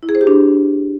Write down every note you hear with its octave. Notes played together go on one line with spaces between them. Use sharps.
E4
G#4
C5
G4
D4